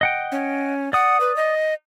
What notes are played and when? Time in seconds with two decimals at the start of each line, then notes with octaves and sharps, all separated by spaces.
0.01 D#5 F#5 G5
0.32 C#4
0.93 D5 F#5 D#6
1.20 B4
1.36 D#5